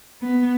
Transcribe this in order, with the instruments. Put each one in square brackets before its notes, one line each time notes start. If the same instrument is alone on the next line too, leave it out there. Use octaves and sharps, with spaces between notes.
[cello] B3